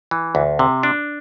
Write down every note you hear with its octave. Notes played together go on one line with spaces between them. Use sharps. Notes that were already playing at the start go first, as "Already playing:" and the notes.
E3
D2
C3
D4